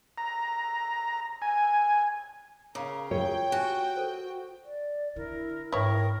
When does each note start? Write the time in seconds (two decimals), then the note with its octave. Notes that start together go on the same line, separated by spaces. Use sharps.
0.18 A#5
1.42 G#5
2.75 C#3 A#4 F5 A#5 D6
3.11 F4 A#4 C#5 G5
3.52 F#4 G4 G#5 C#6
3.97 A4 A#4 C5
4.65 D5
5.16 D3 E4 A#4
5.72 G#2 B3 E4 A#4 C#5 G5